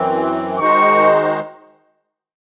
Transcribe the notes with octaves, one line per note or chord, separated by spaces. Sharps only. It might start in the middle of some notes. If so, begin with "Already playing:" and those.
Already playing: F#2 E3 C4
D#3 G#3 D#4 F#4 C5 C#6